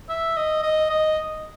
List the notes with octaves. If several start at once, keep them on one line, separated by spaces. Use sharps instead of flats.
E5
D#5
D#5
D#5